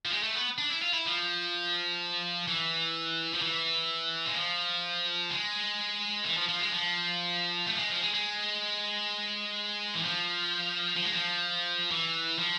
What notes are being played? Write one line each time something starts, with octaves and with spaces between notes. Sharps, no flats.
F3
G#3
A3
B3
D4
E4
F4
E4
F3
E3
F3
E3
G#3
F3
G#3
E3
F3
F3
G#3
F3
A3
F3
G#3
F3
G#3
G#3
E3
F3
F3
G#3
F3
E3
F3